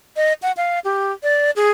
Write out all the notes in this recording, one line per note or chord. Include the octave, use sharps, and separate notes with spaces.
D#5
F#5
F5
G4
D5
G#4